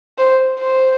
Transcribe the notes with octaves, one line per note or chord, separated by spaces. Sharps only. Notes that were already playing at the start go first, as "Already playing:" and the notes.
C5
C5